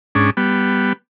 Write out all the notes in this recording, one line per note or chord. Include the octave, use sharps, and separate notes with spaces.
G#2 C#4 D4
G3 B3